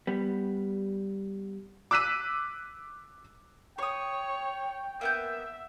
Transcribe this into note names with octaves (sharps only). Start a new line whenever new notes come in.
G3 B3
D6 E6 F#6 B6 D#7
C#5 G5 C#6 D#6
A#3 B3 E5 G6